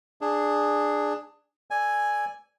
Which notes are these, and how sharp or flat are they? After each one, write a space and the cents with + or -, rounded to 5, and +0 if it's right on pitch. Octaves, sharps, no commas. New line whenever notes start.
D4 +15 G#4 +0
A4 +0 D5 +0 G#5 +0